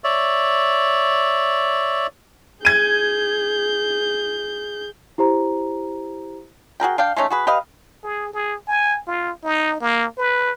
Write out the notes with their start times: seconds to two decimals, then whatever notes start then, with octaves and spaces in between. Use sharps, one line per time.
0.04 C#5 D5 E5
2.65 G#4 G6 G#6 D#7
5.18 E4 G4 C5 A#5
6.80 F#4 G#4 A#4 G5
6.98 D4 F5 G5
7.16 G#3 A3 C#4 D#4
7.30 F#4 G#4 B4
7.47 G4 B4 D#5 F5
8.04 G#4
8.34 G#4
8.68 G#5
9.07 F4
9.44 D#4
9.81 A#3
10.18 B4